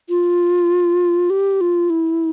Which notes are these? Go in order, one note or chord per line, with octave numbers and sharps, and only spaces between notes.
F4
G4
F4
E4